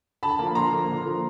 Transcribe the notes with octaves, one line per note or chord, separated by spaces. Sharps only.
D3 A5 B5
F3 A#3
D3 A#5 C6
F3 A#3
D3
F3 A#3